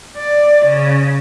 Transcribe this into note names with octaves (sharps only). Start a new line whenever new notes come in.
D5
C#3